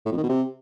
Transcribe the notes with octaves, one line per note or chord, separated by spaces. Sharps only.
A2
F2
D#3
B2
C3